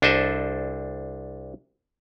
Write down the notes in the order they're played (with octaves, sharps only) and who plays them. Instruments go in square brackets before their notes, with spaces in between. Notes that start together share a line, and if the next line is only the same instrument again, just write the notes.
[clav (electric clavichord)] C2 D4 A4 C5 D#5 E5